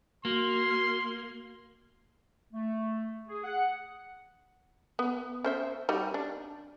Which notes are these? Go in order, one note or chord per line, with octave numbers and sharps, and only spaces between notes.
A#3 F#4 C6
A3
G#4
F#5
B3
C#4 C5 E5
G3 D#4 F#4
D4